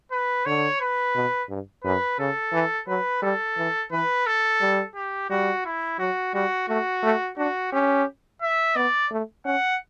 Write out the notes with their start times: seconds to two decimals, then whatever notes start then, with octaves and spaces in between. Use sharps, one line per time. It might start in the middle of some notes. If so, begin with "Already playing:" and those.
0.11 B4
0.45 D3 C#5
0.81 B4
1.15 B2
1.49 G2
1.84 F#2 B4
2.19 C#3 A4
2.53 E3
2.88 F#3 B4
3.22 G3 A4
3.58 E3
3.92 E3 B4
4.26 A4
4.61 G3
4.95 G4
5.30 G3 F#4
5.65 E4
5.99 F#3 F#4
6.34 G3 F#4
6.68 A3 F#4
7.03 A3
7.37 D4 F#4
7.72 C#4 G4
8.42 E5
8.76 B3 D5
9.11 A3
9.45 C#4 F#5